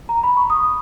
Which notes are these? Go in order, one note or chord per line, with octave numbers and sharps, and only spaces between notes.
A#5
B5
C#6
D#6